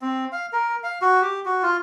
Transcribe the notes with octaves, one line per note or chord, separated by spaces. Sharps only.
C4
F5
A#4
F5
F#4
G4
F#4
F4